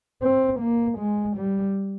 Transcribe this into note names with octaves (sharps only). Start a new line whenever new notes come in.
C4
A#3
G#3
G3